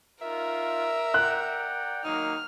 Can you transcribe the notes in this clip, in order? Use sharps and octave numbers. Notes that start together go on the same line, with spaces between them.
D#4 F4 A#4 E5
D5 F#5 G5 F#6
D#3 F#3 A#3 D#4 F6